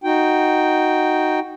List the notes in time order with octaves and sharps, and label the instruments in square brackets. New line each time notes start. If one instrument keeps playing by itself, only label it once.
[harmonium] D#4 F#4 G5